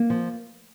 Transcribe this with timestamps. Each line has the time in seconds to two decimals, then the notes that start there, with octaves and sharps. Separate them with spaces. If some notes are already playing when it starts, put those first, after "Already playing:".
Already playing: A#3
0.10 F3